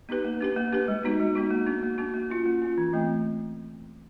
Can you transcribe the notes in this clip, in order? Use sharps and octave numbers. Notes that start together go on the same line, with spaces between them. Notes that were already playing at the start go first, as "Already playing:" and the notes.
B3 D#4 G4 B4
A#3
D4 G4 B4
A#3
D4 G4 B4
G#3
B3 D#4 F#4
G#3
B3 D#4 F#4
A#3
D4 F#4
A#3
D4 F#4
A#3
C#4 F4
A#3
C#4 F4
E3
A3 C4